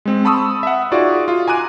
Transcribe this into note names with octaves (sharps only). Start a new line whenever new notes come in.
G#3 C4
A5 B5 C#6 D#6 E6
E5 F#5
D#4 F4 F#4 G#4 D5
F4
G#5 A#5 D6 F#6 D#7